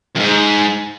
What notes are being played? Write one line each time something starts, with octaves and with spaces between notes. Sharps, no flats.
F2 G#2